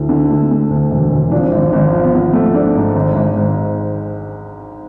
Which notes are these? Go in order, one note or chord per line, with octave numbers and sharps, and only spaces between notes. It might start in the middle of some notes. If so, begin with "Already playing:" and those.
Already playing: D2 A3 E4
D3
A3
A3
D2
E1
E1
F3 D4
C4
D4
G#1
G#1
F3
B3
F3 C4
A3
A3 D4
G#2
G#1
G#1
G#2